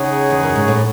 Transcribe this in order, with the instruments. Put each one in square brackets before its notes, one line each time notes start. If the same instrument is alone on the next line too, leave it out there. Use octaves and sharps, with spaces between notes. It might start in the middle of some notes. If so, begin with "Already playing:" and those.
Already playing: [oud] C#3 [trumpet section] D#4 G#4 C#5 F#5
[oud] E2
F#2
G#2
A2